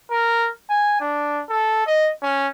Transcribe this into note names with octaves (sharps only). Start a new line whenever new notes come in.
A#4
G#5
D4
A4
D#5
C#4